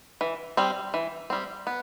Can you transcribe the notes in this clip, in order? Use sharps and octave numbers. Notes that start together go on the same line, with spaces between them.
E3
G3 C4
E3
G3 C4
B3